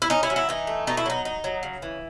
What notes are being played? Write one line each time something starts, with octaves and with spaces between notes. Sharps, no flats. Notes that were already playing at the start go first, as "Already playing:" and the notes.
E4
C#4 D#4
E4
F#3
E4
E3 D#4
A3
B2 D#4
E4
F#3 D#4
D#4
F#3
C#3
E3